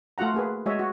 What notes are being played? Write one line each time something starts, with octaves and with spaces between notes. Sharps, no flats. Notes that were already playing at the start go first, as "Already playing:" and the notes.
A3 F4 F#4 F#5 A#5
A#3 G#4 B4
G#3 F#4 G#4 C#5 D#5 E5
F#4